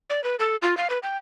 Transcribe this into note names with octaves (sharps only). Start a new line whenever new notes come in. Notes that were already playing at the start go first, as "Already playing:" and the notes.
D5
B4
A4
F4
F5
B4
G5